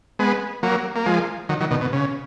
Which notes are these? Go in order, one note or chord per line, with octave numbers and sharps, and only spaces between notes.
G#3 B3
F#3 A#3
A#3
F3 G#3
D#3 F#3
D#3 F#3
B2 D#3
B2
C#3